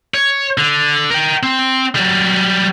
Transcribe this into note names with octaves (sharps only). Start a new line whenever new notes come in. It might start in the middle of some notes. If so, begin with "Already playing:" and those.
C#5
D3
A#4 G5
C4
F#3 G3